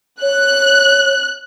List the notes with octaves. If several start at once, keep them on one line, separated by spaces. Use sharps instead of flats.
C#5 F#6